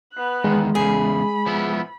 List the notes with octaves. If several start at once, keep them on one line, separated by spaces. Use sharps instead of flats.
B3 F#6
E2 D#3 G#3
E2 C#3 G#4 B5
F3 B3 E4